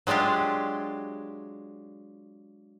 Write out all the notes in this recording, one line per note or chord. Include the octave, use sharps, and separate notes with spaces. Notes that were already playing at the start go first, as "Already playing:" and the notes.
F#3 G#3 D4 F4 G4